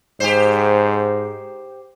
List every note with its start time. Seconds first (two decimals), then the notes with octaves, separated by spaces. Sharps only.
0.20 G#2 G4 C5